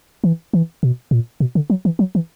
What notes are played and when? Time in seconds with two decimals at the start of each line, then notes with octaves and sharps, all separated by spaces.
0.24 E3
0.53 E3
0.83 B2
1.11 A#2
1.40 B2
1.55 D3
1.70 F#3
1.85 E3
1.99 F#3
2.15 E3